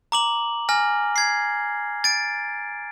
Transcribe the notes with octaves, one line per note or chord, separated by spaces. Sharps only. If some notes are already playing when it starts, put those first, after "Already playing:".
A#5 D6 F#7
G#5 F6 A#6
G#6 C7
A6 D7